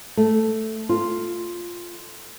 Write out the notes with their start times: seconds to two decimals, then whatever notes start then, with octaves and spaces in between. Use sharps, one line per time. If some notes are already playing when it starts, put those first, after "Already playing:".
0.17 A3
0.89 F4